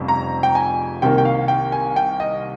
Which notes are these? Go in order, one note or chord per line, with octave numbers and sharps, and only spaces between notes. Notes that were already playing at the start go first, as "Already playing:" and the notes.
Already playing: F1 F2 C#3 G3
A#5
G5
G#5
C2 C3 D#3 A#3 G5
G5
F5
G5
G#5
G5
D#5